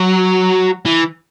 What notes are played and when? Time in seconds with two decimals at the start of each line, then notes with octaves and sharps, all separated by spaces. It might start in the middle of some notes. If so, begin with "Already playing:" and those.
Already playing: F#3
0.86 E3